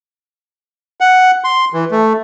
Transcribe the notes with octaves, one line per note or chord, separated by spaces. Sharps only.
F#5
C6
E3
A3